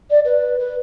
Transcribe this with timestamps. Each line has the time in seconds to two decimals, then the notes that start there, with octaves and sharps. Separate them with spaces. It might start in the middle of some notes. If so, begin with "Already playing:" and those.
0.10 D5
0.25 B4
0.59 B4